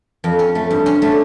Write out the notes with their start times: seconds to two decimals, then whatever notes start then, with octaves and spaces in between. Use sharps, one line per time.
0.24 F2
0.39 C#4
0.55 A3
0.70 G2
0.86 C#4
1.02 A3